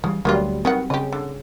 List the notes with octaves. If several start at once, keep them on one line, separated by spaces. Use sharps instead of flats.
C#3 E3 F#3 G3
D2 F#3 G3 A#3 B3 F4
D#3 B3 C4 F#5
C#3 G4 D#5
D3